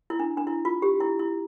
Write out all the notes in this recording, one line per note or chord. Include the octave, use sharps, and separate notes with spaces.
E4
D4
D4
E4
F4
G4
E4
E4